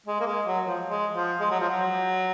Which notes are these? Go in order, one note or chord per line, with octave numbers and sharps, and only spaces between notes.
G#3
A#3
G#3
F#3
F3
G#3
F3
G#3
F#3
F3
F#3